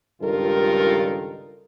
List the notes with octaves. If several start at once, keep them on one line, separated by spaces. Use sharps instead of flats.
C#2 G2 D#3 F4 A4 A#4